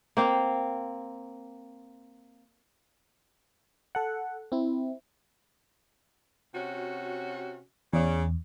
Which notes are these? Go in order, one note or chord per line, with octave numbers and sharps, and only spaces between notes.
A#3 C4 F5
A4 F#5
C4 E4
C3 C#4 F#4
E2 C#3 D5